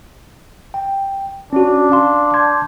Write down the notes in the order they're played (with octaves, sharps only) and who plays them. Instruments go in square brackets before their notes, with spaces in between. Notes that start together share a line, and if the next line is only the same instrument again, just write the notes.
[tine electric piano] G5
[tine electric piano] C#4 F#4 [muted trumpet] D4
[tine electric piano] F5 A5 C6
C6 G6 G#6